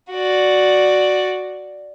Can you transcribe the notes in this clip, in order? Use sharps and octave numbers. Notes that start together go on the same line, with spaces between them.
F#4 D5